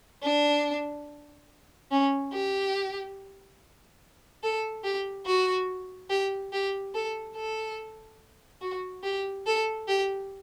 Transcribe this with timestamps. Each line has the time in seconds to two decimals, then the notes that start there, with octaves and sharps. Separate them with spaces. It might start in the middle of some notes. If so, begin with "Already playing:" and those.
0.23 D4
1.91 C#4
2.33 G4
4.43 A4
4.84 G4
5.26 F#4
6.10 G4
6.53 G4
6.94 A4
7.35 A4
8.61 F#4
9.03 G4
9.46 A4
9.88 G4